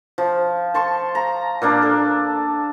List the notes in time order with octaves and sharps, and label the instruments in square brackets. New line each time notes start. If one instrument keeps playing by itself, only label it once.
[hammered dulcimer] F3
A5 C6 C#6
A#5
A#2 A#3 D4
A4